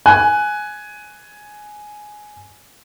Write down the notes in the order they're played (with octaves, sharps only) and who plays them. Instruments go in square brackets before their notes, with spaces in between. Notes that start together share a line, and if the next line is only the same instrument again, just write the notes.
[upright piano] G#5 F#6